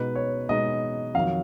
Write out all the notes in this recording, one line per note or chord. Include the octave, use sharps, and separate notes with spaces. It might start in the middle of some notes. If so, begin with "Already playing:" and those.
Already playing: B2 G#3 D#4 B4
C#5
B2 G#3 D#4 D#5
F2 D#3 F#3 F5